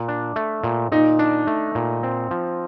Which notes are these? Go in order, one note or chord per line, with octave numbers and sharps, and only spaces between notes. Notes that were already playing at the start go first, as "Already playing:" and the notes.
Already playing: A#2
D4
A3
A#2
A#2 D#4
D4
A3
A#2
C4
F3